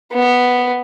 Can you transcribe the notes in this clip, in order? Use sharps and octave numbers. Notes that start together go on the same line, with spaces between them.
B3